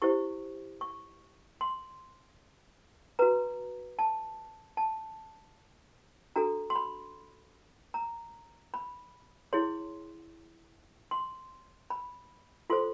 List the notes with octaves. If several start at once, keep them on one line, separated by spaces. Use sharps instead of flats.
E4 G4 C5 C#6
C#6
C6
F#4 B4 A#5
A5
A5
D4 F#4 A4 A#5
C6
B5
A#5
B5
E4 G#4 C#5 C6
C6
B5
F4 A4 C5 C6